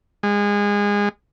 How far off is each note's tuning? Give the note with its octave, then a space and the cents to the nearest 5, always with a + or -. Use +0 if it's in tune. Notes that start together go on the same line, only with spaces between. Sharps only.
G#3 -25